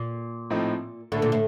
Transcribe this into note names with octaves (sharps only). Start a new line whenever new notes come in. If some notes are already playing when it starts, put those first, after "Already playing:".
Already playing: A#2
A2 F3 C4 D#4 A4
A2 D3 A3 D4 A4
A#2
A2